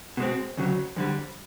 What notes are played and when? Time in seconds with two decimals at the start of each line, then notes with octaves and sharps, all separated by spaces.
0.17 B2 G#3 C4
0.57 D2 C#3 F#3
0.96 F2 D3 G3